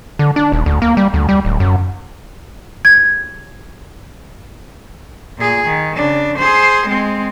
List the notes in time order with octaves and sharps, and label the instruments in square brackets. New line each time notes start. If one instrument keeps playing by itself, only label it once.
[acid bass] D3
D4
D#1
D2
A#3
G3
D2
G3
D1
F#2
[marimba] G#6
[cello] A#2 G#4
D#3
C#3 D4
G#4 C5
G#3 C4